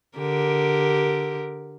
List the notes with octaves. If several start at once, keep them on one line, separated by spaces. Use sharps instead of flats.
D3 G4 A#4